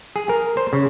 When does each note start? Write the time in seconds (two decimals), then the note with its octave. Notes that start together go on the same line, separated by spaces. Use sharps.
0.16 G#4
0.29 A#4
0.57 C5
0.73 C#3